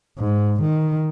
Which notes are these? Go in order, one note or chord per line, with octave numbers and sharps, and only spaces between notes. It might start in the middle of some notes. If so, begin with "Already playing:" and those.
G#2
D#3